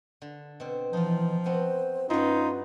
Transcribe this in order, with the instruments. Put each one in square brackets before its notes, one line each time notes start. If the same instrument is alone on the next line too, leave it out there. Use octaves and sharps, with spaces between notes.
[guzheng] D3
B2 C4
[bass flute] E3 [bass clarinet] F3 [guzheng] D#4 F4
[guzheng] B3 C4 F#4 [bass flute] C5
[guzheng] G2 B3 F#4 [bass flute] C#4 [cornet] D#4 [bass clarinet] F4